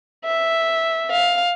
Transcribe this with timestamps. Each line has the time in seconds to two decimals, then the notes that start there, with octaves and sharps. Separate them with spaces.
0.25 E5
1.11 F5